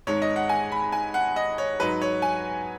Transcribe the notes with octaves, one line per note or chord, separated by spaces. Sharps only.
G#1 G#2 G#3 C#5
D#5
F#5
G#5
B5
G#5
F#5
D#5
C#5
G#2 F#3 D#4 B4
C#5
G#5